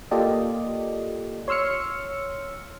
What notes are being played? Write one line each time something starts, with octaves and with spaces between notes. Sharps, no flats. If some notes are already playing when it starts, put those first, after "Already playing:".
A#3 F4 G4 A4 D5 D#5
C#5 C6 E6 F6 C#7